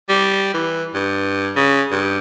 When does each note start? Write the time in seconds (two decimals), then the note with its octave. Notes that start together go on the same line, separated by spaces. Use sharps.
0.09 G3
0.54 E3
0.94 G2
1.56 C#3
1.91 G2